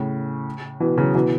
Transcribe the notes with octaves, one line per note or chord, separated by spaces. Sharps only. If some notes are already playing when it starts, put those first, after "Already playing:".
Already playing: A2 C#3
B2 E3
C#3 F#3
B2 E3